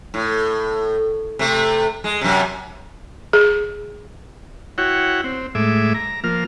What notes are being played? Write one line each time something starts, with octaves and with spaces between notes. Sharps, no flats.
A2
C3 A3
G#3
F#2 C3
G#4
E4 F#4 C#5 F#5 G5
C4
A2 G#3 E5 D6
A#5
F3 A#3 F6